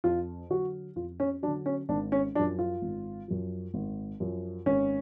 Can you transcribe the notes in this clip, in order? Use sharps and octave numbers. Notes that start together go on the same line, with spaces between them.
F2 F4
D3 F#3 F#4
F2 F4
C#4
F#3 D4
D3
C#4
G#1 D4
C#4
F#2 F3 D4
F4
G#1
F#2 F3
G#1
F#2 F3
G#1 C#4